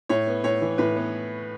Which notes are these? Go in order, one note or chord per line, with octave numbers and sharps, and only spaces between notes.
A2 C#5
B3
A2 C#5
E3
A2 B4
B3